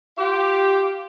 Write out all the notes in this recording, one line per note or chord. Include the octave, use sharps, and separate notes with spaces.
F4 G4